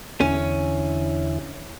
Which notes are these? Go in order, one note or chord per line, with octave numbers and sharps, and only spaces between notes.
E2 D3 C#4 E4